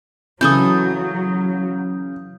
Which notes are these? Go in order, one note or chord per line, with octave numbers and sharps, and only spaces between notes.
C#3 E3 F#3 A4 C#6 D#6 G6